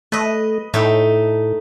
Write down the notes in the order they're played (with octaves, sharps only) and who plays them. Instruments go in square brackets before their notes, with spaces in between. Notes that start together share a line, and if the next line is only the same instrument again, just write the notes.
[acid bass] A3 [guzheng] B4 D#5
[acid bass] A2 [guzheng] A3 D#4 G5